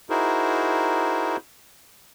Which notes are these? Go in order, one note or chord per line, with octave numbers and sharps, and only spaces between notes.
D#4 E4 F#4 G#4 A#4 C5